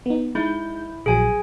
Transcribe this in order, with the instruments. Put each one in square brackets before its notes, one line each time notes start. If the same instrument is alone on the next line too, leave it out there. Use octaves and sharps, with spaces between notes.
[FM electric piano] B3 D#4
[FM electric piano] G#3 D#4 G6 [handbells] E4
[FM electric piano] A#1 F#3 [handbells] G#4 G#5